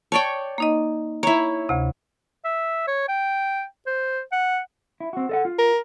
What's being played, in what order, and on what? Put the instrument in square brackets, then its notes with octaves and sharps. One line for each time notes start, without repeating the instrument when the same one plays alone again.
[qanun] C#5 D5 G5 [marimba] A5 C#6
[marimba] A#3 D#4 D#5
[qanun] E4 C#5 [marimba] A#5
[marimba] D2 C3
[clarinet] E5
C#5
G5
C5
F#5
[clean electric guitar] E4
C4 F#4
A4 D#5 F#5
F4
[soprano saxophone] A#4